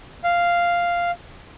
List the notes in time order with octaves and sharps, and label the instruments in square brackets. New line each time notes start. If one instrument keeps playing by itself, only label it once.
[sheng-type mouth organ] F5